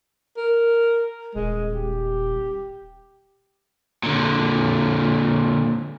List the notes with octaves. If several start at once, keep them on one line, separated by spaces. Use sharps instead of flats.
A#4
D#1 G#3
G4
A#2 D3